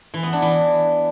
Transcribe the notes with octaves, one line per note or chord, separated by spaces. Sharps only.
E3
B3
D4
E3